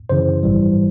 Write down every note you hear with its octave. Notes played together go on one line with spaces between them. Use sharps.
F#2 C#3 E3 C5
A1 G#2 E3 G3